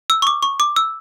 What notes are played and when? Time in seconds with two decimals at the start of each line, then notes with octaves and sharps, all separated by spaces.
0.10 E6
0.22 C#6
0.27 D6
0.43 C#6
0.60 D6
0.76 E6